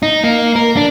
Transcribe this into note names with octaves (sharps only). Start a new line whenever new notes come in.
D#4
A#3
A#4
D4